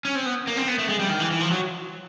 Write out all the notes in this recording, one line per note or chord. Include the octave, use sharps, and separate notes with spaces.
C#4
C4
B3
A#3
C4
B3
A3
G#3
G3
D#3
E3
E3
F3
F#3